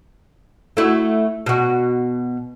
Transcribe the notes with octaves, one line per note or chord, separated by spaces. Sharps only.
A3 E4 F#4
B2 F#4